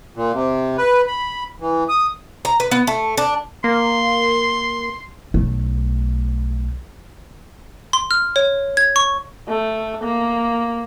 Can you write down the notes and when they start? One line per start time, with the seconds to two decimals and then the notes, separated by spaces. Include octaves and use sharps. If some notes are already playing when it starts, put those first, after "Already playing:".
0.16 A#2
0.33 C3
0.78 B4
1.07 B5
1.60 E3
1.89 D#6
2.45 A#5
2.60 B4
2.71 B3
2.87 A3
3.17 D4
3.64 A#3 C6
5.34 B1 A3
7.93 C6
8.11 F6
8.36 C#5
8.77 G#6
8.96 C#6
9.48 A3
10.03 A#3